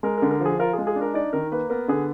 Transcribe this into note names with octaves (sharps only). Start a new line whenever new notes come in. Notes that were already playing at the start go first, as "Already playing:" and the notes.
G#3 A#4
A#4
D3
A#4
F3
G#4
F4 A#4
G#4
G#3
G#4
D4
A#4
D#4 D5
D#3 A#4
A#3 B4
B3 A#4
D3 G#4